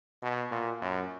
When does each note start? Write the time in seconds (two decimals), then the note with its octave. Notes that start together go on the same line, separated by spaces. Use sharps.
0.23 B2
0.51 A#2
0.82 F#2